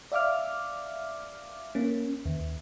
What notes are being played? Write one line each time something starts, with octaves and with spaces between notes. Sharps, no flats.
D5 E5 F5 D6 F6
A#3 C#4
D#2